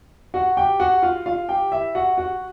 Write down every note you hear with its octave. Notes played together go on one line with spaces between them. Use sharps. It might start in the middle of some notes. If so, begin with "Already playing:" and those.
F#4 F#5
G4 G5
F#4 F#5
F4 F5
F4 F5
G4 G5
E4 E5
F#4 F#5
F#4 F#5